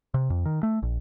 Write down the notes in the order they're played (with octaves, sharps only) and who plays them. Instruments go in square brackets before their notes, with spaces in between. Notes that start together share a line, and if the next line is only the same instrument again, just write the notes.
[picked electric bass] C3
F2
D#3
A3
A#1